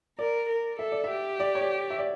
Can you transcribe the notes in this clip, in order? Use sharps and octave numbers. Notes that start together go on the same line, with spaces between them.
A#4 D5
A#4
A4 E5
D5
E5
G4
D5
C#5
D5
E5
D5